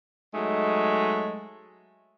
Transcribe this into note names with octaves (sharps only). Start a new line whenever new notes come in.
F#3 G#3 A3 D#4